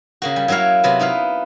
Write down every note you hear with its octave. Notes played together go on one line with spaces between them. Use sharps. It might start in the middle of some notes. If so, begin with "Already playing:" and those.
C#3 A#3 F#4
G3
F#3 A#3 E4 C#5 F5
C3 F#3 B3
D#4 E4 B4 F5